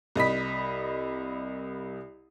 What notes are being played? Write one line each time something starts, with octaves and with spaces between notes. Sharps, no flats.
C2 D#5 B5 B6